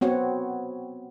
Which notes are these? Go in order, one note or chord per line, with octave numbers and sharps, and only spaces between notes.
B3 C4 F#4 C#5